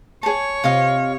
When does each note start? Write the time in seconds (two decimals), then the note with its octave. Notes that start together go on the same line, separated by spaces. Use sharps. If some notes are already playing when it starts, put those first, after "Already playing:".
0.23 G#4 C#5 A5
0.64 C3 F4 D#5 F5